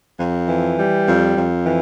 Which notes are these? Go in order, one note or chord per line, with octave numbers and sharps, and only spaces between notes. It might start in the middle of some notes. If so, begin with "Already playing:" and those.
F2
E3
G3
F2
F2
E3